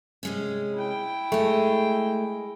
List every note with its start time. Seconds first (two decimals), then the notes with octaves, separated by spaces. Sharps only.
0.23 C3 G#3 C#4
0.74 E4 G5
1.32 G#3 A3 G#4